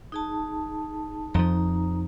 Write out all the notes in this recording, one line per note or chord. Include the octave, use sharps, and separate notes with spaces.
D#4 G#4 A5
F2 F3 D#4 A#5